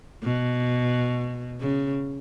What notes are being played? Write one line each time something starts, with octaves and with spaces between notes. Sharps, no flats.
B2
C#3